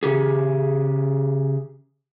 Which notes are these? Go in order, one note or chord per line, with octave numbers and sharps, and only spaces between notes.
C#3 G4 G#4